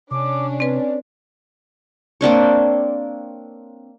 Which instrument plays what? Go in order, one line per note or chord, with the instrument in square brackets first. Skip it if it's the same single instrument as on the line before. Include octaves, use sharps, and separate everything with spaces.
[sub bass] C3 [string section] C#4 D4 [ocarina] D6
[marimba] C4 B4 [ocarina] D5
[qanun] A#3 C4 D4 C#5